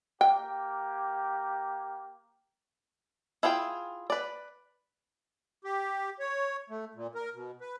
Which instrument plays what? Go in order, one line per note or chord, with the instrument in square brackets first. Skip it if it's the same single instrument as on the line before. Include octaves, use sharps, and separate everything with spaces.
[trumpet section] A#3 G4 [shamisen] G5
[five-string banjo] E4 F4 G#4 C#5 G5
B4 D5
[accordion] G4
C#5
A3
A#2
A#4
B2
B4